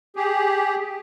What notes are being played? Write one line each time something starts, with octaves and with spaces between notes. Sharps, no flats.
G4 G#4